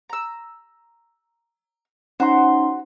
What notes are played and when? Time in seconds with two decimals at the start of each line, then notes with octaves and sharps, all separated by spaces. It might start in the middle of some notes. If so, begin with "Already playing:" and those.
0.10 A#5 E6
2.20 C#4 D#4 F#4 C5 C6